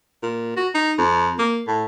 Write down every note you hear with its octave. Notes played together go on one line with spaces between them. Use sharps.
A#2
F#4
D#4
F2
A#3
A2